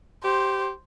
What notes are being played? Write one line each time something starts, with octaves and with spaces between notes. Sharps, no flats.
G4 C5